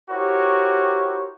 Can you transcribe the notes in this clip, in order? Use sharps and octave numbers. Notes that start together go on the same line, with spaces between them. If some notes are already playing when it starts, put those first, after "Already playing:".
E4 F#4 G4 A#4 C5 C#5